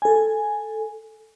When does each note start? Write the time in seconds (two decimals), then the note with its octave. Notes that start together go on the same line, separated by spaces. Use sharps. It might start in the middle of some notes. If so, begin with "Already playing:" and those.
0.02 A4 G#5